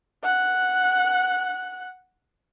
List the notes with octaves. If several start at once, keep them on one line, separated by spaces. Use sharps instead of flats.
F#5 F#6